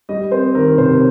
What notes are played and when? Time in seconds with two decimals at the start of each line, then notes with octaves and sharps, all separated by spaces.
0.09 G3 D#5
0.31 C4 C5
0.55 D#3 A#4
0.78 C3 C5